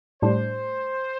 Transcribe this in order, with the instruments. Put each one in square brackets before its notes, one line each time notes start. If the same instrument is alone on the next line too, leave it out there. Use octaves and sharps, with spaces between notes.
[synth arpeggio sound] A2 G3 D4 [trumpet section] C5